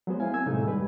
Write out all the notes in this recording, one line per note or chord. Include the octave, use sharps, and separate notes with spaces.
F#3 G#3 B3 C5
E4 F5 G#5
A#3 C4 G#5 E6 G#6
A2 C3 G#3 A3 D#4
D#2 G3 G#3 B4